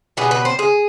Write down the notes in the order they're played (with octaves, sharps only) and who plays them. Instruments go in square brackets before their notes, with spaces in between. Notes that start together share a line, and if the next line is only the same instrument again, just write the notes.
[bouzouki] B2 G3 B3 G#4
B4
C5
G#4